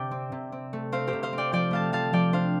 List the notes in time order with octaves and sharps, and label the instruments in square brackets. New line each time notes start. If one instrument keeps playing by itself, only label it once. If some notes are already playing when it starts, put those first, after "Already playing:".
Already playing: [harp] C3 G4 D5 G5
C4
C3
C4
A3
C4 C5 F5
G4 C5
C3
C5 F5
C4
D5 G5
F3 D5 G5
A3 F5 A5
F3 F5 A5
F3 D5 G5
D4 C5 F5